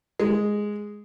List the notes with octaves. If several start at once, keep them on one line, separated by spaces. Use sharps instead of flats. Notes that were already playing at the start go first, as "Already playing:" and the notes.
G#3